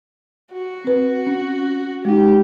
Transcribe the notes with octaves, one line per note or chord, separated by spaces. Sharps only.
F#4
C4 B4
C#4
G#3 D#4 G4